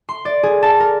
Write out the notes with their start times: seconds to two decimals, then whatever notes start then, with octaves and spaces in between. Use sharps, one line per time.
0.09 C6
0.25 D5
0.43 G#4
0.62 A5
0.80 A#4